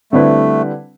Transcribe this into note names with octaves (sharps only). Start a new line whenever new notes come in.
D3 G3 A3 C4 E4 B4